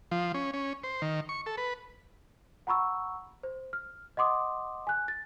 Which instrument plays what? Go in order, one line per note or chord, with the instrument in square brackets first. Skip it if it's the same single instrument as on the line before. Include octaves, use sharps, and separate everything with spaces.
[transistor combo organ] F3
C#4
C#4
C5
D#3
C#6
A4
B4
[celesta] F#5 A#5 B5 C#6 E6
C5
F6
D#5 F#5 C6 D6 D#6
G#5 F#6
A6